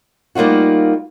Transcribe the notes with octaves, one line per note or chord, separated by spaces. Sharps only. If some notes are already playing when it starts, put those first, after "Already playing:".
G3 A#3 D#4 F4 F#4